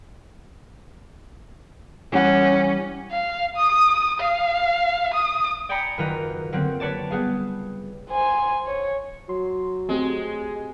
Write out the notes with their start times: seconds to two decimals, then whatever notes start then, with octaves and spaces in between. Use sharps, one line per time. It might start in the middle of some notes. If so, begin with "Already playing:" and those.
2.12 E3 G3 C#4 F#5
3.11 F5
3.57 D#6
4.20 F5
5.14 D#6
5.69 D5 G5 G#5 A#5 B5 C#7
5.98 F#1 D#3 F4 B4 A#5 D#7
6.52 D3 F#3 A#3 C4
6.80 B4 C#5 D5 A5
7.11 G3 B3 G#4 F5
8.10 C5 G#5
8.67 C#5
9.29 F#3 C6
9.89 G#3 A3 C4 G4